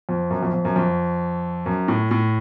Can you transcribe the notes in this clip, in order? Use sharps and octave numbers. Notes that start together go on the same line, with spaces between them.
F2
F#2
F2
F2
F#2
F2
F#2
A2
A2